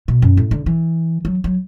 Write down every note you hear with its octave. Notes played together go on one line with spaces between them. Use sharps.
B2
F#2
A2
D3
E3
F#3
F#3